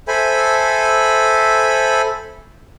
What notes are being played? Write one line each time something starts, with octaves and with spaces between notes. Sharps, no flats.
A4 C5 E5 G#5 B5